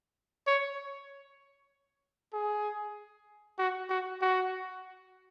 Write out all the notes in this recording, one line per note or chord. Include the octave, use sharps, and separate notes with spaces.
C#5
G#4
F#4
F#4
F#4